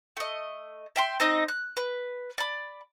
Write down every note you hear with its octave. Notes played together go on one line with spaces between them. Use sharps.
A3 D#5
E5 G5 C6
C4 D#4 D#5 D#6
F#6
B4
D5 B5